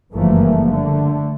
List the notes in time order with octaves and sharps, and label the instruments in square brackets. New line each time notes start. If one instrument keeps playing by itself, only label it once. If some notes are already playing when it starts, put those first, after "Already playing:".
[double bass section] F#1 G2 E3 F3 A3 A#3
D3 A3